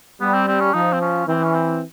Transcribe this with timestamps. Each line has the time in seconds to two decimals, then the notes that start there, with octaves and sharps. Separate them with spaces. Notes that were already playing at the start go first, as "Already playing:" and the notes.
0.21 G3 B3
0.34 C4
0.48 C4
0.60 C#4
0.74 F3 D#4
0.93 C4
1.01 C#4
1.27 E3 C4
1.44 C#4
1.54 C4